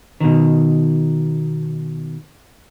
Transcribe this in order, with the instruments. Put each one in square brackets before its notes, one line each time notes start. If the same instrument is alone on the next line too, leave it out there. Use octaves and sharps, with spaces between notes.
[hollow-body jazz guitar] B2 D#3